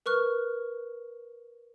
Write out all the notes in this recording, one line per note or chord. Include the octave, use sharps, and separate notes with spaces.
A#4 B4 C#6 F6 F#6